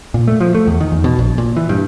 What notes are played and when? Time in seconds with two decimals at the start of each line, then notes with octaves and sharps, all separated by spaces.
0.14 A#2
0.28 A3
0.40 F3
0.55 A3
0.67 E2
0.81 D#3
0.92 E2
1.04 B2
1.19 A#1
1.38 A#2
1.57 E3
1.69 G2